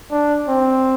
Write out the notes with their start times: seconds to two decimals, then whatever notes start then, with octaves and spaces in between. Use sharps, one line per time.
0.11 D4
0.49 C4